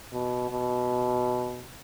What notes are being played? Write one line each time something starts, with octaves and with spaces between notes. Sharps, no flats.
B2
B2